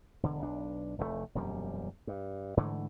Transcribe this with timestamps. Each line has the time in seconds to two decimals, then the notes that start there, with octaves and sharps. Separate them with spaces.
0.23 E1 D3
0.42 B1 D4
0.98 F1 E2 G2 A3
1.35 E1 F#2 A#2 G3
2.07 G2
2.57 G#2 D3 E3 A3